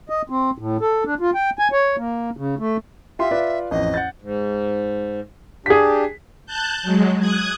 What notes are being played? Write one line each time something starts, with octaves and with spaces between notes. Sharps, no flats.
D#5
C4
A2
A4
D4
F4
G5
G#5
C#5
A#3
C#3
A3
F4 G4 E5 C6
F4 B4 D5
A1 F2 D#5
F#5 G6 A6
G#2
D4 G4 G#4 B6
A5 F#6 G6
F#3 G#3
D#6 F#6 G#6